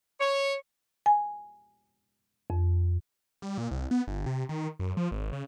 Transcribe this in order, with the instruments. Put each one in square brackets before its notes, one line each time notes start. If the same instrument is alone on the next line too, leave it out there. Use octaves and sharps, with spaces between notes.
[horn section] C#5
[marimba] G#5
F2
[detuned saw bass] G3
A#2
C2
B3
G1
C3
D#3
F#2
F3
G#1
C#3